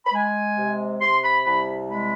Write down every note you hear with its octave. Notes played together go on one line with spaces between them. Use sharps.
B5
G#3 G#5
C3
C3 C6
B5
C2 B5
G#3 B5